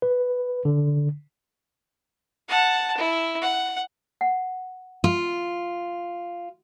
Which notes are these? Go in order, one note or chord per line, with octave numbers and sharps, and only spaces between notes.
B4
D3
F#5 A5
E4
F#5
F#5
F4